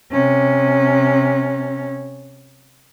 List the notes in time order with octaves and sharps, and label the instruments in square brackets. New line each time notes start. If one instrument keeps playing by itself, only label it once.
[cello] C3 C#4